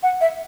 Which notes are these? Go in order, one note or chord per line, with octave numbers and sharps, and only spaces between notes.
F#5
E5